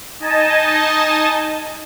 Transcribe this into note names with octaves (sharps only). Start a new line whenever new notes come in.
D#4 D#5 G#5 A5